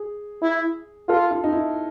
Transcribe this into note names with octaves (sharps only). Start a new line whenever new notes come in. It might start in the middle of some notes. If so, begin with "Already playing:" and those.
Already playing: G#4
E4
F4 A4
F4
D#4
E4